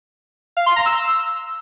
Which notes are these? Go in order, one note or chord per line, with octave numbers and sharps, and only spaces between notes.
F5
C6
A#5
E6